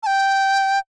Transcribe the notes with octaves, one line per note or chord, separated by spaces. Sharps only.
A5
G5